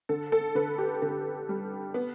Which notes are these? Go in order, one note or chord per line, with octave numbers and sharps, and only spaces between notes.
D3 A4
A4
D3 B4
G4
D3 A4
G3
B3